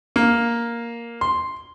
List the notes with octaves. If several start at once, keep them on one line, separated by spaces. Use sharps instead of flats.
A#3
C6